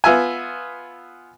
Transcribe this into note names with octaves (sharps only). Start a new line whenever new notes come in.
B3 F4 E5 G#5